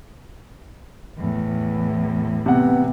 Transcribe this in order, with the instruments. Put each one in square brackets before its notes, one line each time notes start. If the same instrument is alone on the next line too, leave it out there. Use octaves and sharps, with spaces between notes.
[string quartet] E2 A2
[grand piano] C3 F#5 [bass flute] B3